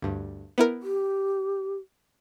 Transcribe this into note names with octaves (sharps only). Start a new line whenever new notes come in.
D2 G2
B3 E4 A#4
G4